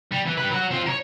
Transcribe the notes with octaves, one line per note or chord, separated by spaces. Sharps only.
G3
E3
G3 B4
F#3 F#4
C4 F4
A#4 C#5